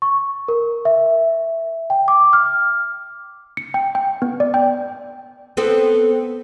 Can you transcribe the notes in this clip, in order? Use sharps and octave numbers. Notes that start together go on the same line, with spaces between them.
C#6
A#4
E5
G5
D6
F6
C#7
G5
G5
B3
D5
G5
B3 C4 A4